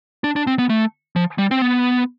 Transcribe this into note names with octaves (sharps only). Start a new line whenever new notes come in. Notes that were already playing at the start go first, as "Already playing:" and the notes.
D4
D4
C4
B3
A3
F3
G3
C4
B3